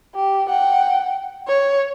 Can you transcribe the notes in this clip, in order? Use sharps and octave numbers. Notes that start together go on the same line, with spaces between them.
G4
F#5 G5
C#5